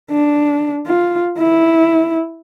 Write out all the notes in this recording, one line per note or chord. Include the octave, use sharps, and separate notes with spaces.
D4
F4
E4